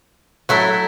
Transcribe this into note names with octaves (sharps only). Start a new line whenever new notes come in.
F#3 A3 E4